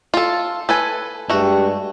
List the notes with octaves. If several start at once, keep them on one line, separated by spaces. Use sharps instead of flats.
F4 A4
A4 B4 G#5
G2 G#3 A3 F#4 G4